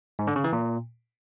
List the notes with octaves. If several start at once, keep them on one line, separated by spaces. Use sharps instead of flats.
G#2
D3
C#3
E3
A#2